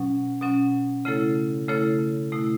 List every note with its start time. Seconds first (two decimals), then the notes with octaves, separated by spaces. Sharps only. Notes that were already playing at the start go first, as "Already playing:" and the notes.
Already playing: B2 F#3 C#4
0.42 B2 F#3 C#4
1.05 C#3 A3 E4 A4 C#5
1.68 C#3 A3 E4 A4 C#5
2.32 B2 A3 E4